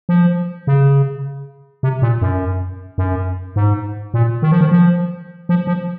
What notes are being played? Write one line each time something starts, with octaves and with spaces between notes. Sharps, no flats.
F3
C#3
C3
A#2
F#2
F#2
G#2
A#2
D#3
F3
D#3
F3
F3
F3